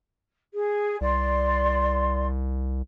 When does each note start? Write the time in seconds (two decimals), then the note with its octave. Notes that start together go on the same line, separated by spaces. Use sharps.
0.53 G#4
1.01 C2 D5 C6